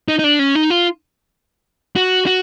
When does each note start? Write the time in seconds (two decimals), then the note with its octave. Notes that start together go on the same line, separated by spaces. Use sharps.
0.08 D#4
0.19 D#4
0.24 D4
0.39 C#4
0.55 D#4
0.70 F4
1.96 F#4
2.27 F#4